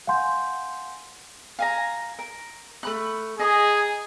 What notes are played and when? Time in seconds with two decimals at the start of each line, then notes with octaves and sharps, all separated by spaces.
0.07 F5 F#5 G#5 C6 G6
1.59 F5 G#5 A#5
2.19 A#4
2.83 A3 B5 F#6
3.39 G#4 D#5 A#5 D#6